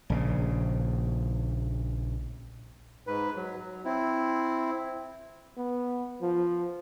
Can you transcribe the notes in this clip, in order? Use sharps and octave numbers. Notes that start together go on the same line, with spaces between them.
A#1 C#3
G#2 B4
F#3
F#3
C4 E4
B3
F3